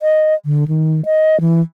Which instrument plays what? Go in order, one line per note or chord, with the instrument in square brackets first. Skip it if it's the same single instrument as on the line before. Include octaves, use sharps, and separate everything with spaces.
[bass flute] D#5
D3
D#3
D#5
E3